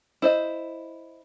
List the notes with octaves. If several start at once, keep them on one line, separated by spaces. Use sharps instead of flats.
E4 C5 D#5